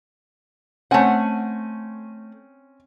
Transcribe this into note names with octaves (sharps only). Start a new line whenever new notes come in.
A3 C4 C#4 F#5 G#5